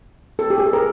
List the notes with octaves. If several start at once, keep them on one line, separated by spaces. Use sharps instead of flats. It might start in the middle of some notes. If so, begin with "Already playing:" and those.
A4
G4
G#4
A4
A#4